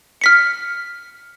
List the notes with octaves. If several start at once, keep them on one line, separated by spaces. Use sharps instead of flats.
F6 B6 C#7